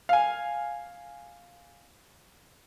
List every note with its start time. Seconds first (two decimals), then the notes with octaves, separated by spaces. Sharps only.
0.09 F5 G#5